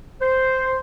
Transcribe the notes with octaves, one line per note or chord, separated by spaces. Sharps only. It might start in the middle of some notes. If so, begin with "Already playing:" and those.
C5